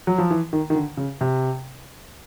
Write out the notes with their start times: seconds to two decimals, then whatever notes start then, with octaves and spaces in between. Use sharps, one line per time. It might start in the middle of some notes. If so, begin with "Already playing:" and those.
0.07 F#3
0.18 F3
0.31 E3
0.53 D#3
0.70 D#3
0.75 D3
0.97 C#3
1.21 C3